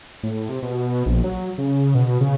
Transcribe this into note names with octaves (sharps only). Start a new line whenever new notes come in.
A2
C3
B2
A#1
F#3
C#3
B2
C#3